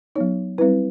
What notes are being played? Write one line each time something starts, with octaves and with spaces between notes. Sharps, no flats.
F#3 B3 D#4 C#5
G3 C4 E4 B4